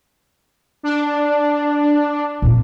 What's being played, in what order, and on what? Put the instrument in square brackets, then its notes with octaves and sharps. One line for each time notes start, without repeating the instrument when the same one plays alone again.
[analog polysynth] D4
[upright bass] A#2 C4